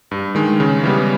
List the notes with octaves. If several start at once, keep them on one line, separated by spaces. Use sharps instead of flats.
G2
D#3 G#3
C#3
E3 G3 B3